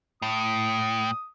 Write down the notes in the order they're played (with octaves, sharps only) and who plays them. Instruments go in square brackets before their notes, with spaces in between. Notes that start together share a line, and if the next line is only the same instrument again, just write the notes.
[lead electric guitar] A2 [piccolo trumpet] D#6